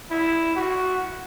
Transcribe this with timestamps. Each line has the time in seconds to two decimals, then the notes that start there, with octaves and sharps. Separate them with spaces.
0.10 E4
0.56 F#4